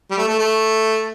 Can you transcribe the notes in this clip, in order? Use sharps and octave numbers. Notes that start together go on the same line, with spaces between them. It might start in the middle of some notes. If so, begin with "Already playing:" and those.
G3
A3
A3
A3